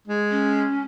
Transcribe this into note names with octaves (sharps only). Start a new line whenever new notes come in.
G#3
C#4